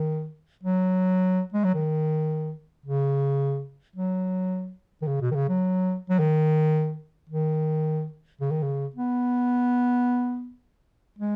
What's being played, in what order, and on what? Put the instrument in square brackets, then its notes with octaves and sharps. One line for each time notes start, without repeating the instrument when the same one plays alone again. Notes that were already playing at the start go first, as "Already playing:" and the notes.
Already playing: [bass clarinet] D#3
F#3
G#3
F#3
D#3
C#3
F#3
D#3
C#3
B2
D#3
C#3
F#3
F#3
D#3
D#3
C#3
D#3
C#3
B3
G#3